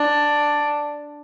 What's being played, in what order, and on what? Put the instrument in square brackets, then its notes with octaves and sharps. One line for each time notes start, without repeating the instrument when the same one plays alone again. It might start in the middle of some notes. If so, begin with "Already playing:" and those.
Already playing: [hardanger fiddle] D4